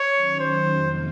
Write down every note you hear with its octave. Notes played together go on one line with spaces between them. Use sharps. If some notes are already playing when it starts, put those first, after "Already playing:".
Already playing: C#5
D#3 F#3 C#4
C5
F2 C3 D#3 A#3 F4